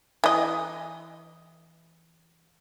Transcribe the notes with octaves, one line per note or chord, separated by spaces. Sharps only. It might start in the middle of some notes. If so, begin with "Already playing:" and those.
E3 D#5